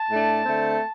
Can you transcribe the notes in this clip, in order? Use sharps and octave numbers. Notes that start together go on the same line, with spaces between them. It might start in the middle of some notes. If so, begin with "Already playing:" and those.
Already playing: A5
A2 A3 D4
D3 A3 C4